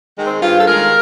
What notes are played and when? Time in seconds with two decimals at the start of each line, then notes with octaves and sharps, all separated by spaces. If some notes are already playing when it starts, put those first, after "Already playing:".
0.17 D#3 G#3
0.26 C4
0.42 G2 F4
0.60 A4
0.67 D#3 G#3 A#4